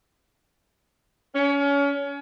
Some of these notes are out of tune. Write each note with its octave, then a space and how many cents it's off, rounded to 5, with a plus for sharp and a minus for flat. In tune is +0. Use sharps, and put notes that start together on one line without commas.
C#4 +30